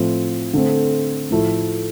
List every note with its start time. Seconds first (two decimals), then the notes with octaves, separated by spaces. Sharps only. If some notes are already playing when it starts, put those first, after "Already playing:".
Already playing: A2 F3 C4
0.53 D3 A3 C4
1.31 A2 F3 A3 E4 A4